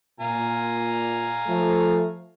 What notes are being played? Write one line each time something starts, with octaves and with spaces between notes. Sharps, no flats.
A#2 F5 G#5 A#5
F3 A3